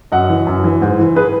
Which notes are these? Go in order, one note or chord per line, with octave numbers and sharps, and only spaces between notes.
F#2 D#5 F#5
E3
F#2
E3
G#2
E3
G#4 B4